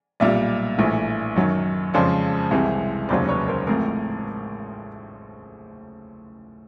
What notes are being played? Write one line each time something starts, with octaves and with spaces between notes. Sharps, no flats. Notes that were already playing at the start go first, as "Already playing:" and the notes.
B1 A#2 G3 D5 E5
A#1 A2 E3
F#2 D#3 F#3
F2 C#3 F3 G#3 C5 D5
C2 C3 E3 G#3 C4
F1 D#2 C#3 F#3 C5 D5
B4 C#5
A#4 C5
A1 A2 F3 G#3 C4 G#4 A#4